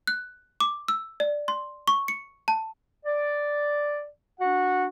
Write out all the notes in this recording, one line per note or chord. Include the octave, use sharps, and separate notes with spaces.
F#6
D6
E6
D5
C6
C#6
C#7
A5
D5
D4 F#4 F#5